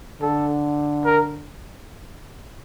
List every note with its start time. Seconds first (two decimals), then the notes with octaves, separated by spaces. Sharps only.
0.21 D3 A4
1.05 A#4